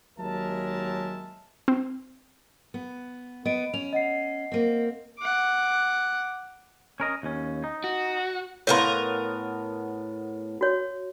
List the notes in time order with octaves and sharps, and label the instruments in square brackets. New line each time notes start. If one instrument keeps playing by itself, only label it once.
[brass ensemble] D#2 F#3 G#3 A#4 E5 A5
[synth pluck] C4
[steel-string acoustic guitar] B3
[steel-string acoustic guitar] B3 [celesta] D#5 D7
[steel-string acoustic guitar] C#4 [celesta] F7
[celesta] D#5 F#5 C7
[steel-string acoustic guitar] A#3 C4
[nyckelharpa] F#5 D6
[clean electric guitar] C#4 A#4 D#5
D#2 C#4
D#4
[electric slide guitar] F#4
[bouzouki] A2 B3 A#4 [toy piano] C#5 F5 C6
[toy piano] F#4 C#5